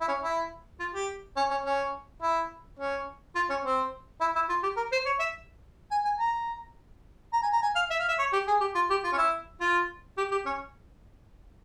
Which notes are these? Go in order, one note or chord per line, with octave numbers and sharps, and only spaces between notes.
E4
C#4
E4
F4
G4
C#4
C#4
C#4
E4
C#4
F4
C#4
C4
E4
E4
F4
G4
A#4
C5
C#5
E5
G#5
G#5
A#5
A#5
G#5
A#5
G#5
F5
E5
F5
E5
C#5
G4
G#4
G4
F4
G4
F4
C#4
E4
F4
G4
G4
C#4